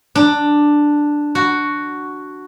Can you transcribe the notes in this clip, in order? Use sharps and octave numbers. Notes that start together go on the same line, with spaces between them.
D4
F#4